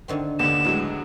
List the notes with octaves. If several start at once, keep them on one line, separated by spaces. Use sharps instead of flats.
D3 D#3 C4
D#2 D3 B3 E7
A2 F#3 G#3 B4